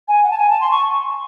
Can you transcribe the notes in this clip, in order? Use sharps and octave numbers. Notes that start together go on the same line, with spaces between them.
G#5
F#5
A5
G#5
A5
C6
C#6